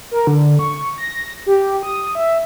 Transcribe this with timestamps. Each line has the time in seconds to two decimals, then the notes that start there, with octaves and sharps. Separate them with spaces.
0.11 A#4
0.27 D3
0.59 C#6
0.98 A#6
1.46 G4
1.83 D#6
2.15 E5